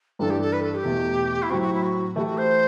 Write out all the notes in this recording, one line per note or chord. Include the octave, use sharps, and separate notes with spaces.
G2 E3 G3 D4 A4
G4
A4
B4
A4
G4
E2 B2 A3
E4
A2 F#3 C4 F#4
F#4
E4
F#4
E3 A3 E4 F#4 G4
F#4
C5